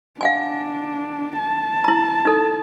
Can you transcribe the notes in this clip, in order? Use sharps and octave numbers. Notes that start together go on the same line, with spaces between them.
D4 F5 F#5 G#5
A5
E4 A#5
D#4 A4